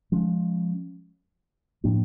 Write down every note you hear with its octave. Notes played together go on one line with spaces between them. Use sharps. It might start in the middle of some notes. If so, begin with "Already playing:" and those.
F3 G#3 C#4
A2 F3 A#3 D4